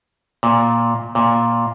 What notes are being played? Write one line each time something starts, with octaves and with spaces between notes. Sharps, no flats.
A#2
A#2